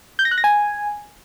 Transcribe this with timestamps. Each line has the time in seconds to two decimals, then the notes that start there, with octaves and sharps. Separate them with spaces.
0.19 G6
0.25 A#6
0.31 F#6
0.38 A#6
0.44 G#5